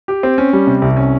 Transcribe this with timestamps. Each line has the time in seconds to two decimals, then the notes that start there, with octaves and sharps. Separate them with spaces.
0.08 G4
0.23 C4
0.38 C#4
0.53 G3
0.67 C3
0.82 C2
0.97 C#4